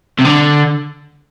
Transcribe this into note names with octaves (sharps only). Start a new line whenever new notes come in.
C3
D3